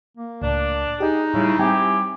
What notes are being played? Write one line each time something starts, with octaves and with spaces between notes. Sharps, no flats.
A#3
C#2 A2 D4
D#4 G4 G#4 D#5
A2 C#3 G3 E4
G3 C4 E4 G4 G5 G#5